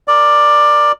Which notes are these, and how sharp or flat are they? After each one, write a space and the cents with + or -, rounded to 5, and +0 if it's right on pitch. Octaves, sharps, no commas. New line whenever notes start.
A#4 +0 D5 +10